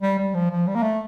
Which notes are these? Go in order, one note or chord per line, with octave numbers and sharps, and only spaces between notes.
G3
G3
F3
F3
G3
A#3
A3